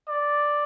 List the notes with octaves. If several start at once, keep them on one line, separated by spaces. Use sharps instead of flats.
D5